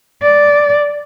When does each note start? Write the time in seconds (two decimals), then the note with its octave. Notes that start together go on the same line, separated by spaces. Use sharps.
0.22 D5